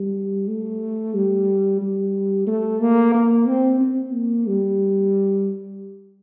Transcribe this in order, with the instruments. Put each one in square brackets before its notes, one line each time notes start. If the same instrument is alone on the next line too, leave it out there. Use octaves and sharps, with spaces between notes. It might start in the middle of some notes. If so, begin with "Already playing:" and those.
Already playing: [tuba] G3
A3
G3
G3
A3
A#3
A#3
C4
C4
A#3
G3